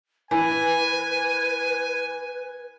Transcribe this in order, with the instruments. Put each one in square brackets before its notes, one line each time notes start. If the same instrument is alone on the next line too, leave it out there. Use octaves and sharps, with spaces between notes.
[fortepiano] E3 [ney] B4 [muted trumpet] G#5